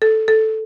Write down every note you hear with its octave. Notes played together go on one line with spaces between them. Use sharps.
A4
A4